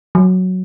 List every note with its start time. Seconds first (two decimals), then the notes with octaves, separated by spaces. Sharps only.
0.15 F#3